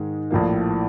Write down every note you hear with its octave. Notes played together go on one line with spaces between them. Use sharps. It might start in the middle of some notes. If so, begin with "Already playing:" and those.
Already playing: G#2 D#3 G#3
A#1 A2 F3 A#3